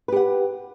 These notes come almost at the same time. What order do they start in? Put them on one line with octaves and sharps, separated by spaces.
B4 G4 F#5